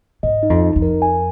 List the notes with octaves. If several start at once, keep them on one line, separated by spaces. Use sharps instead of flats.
G#2 D#5
D#4
F2
D#4
F2
A#4
G#5